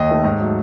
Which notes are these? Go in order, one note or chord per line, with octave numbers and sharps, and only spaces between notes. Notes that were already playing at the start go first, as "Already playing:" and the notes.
Already playing: D#2 D#5
D#3 A3
G#2
F#3 A3